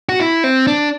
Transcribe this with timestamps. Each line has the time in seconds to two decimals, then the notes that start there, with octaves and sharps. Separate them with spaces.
0.09 F#4
0.20 E4
0.44 C4
0.67 D4